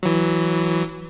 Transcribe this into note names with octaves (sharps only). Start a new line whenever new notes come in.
E3 F#3